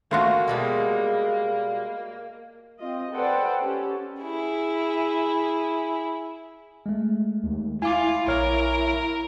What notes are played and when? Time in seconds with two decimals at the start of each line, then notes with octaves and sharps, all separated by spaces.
0.11 A3 A#3 F4 F#4
0.48 B2 G3 G#3
2.78 C4 F4 D#5
3.12 A4 B4 C5 D5 F#5 G5
3.61 C#4 G4 A4
4.22 E4 G#4
6.86 G#3 A3
7.43 D#2
7.82 E4 F4 G#5 D6
8.28 A#1 A#4 C#5 F6